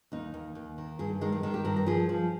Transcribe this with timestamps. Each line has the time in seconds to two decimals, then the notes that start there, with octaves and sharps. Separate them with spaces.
0.12 D#2 D#4
0.34 D#2
0.55 D#2
0.78 D#3
0.99 G2 G#4
1.21 D#3 G#3
1.32 G3
1.43 D#3 G#3
1.54 G4
1.65 G2 A#4
1.76 A#4
1.86 F3 G#4
2.09 F3